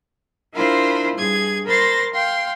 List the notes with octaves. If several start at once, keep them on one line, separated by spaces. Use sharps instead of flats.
D4 E4 F4 A#4 C5 B5
G2 G#4 G#6
A#4 C5 B5 C6 A6 A#6
F5 G5 C6